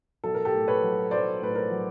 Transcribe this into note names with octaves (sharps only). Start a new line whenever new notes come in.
B1 A4
A#4
G4 A4
A2
B4 C#5
F#3
B1 C5 D5
A2 B4
A#4 C5
F#3